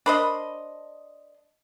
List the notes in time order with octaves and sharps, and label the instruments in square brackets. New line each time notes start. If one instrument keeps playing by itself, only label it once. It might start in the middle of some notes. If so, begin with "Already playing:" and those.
[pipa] D4 C5 D#5 [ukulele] A#4 B5